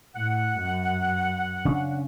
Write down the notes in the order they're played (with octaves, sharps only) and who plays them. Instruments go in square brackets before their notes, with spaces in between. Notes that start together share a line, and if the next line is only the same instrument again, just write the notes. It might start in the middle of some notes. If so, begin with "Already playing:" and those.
[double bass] A2 [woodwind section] F#5
[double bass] F#2
[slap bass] C#3 C#4 D4